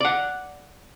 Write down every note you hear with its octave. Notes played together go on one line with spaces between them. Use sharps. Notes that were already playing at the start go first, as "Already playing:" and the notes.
D5 F#5